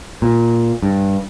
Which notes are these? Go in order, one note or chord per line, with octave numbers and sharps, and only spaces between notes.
A#2
G2